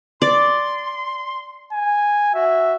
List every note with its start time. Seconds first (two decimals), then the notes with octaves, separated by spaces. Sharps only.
0.22 D5 C6
1.72 G#5
2.34 F#4 E5